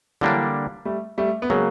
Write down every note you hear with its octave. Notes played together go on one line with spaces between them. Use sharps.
D3 E3 F#3 G3 A#3 D4
G3 A3
G3 A3
B3
C#3 F#3 G#3 A#3